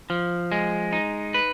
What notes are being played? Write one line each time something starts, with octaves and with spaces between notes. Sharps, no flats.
F3
G#3
D#4
B4